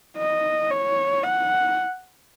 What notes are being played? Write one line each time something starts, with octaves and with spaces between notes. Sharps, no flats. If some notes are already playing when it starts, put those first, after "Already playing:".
D#5
C#5
F#5